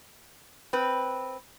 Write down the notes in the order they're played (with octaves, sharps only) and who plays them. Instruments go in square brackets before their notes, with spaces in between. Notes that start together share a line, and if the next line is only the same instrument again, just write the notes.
[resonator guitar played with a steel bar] C4 B4